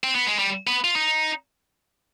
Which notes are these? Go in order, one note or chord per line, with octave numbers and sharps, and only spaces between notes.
C4
B3
G#3
G3
B3
F4
D#4